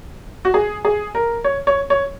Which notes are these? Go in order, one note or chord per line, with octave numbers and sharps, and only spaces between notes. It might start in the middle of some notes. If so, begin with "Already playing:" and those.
F#4
G#4
G#4
A#4
C#5
C#5
C#5